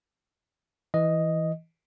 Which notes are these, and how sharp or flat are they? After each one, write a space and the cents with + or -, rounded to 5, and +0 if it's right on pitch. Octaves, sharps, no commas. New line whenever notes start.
E3 -10 D#5 +0